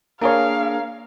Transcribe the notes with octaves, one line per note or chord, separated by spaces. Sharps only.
A#3 D4 G#4 A#4 C#5 F5